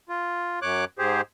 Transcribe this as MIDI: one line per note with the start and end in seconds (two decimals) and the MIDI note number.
0.09 0.59 65
0.62 0.85 42
0.62 0.85 73
0.62 0.85 86
0.62 0.85 90
0.99 1.21 44
0.99 1.21 67
0.99 1.21 68
0.99 1.21 72